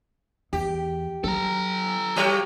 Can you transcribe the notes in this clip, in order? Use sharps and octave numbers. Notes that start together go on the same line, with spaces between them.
E2 G4
F#3 A4 A#5
F#3 G4 C#5